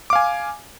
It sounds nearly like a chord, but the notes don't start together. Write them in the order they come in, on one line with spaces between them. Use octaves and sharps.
D6 F5 G#5